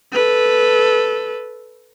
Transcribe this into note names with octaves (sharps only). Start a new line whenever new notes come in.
A4 B4